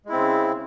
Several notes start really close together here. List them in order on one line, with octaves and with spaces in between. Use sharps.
G#3 E4 C4 C#3